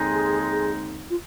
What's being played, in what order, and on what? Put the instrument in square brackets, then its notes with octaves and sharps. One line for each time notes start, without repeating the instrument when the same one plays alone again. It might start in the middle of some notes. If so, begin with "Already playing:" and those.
Already playing: [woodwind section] D#2 D3 G#3 C4 D#4 [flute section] G#4
[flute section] F4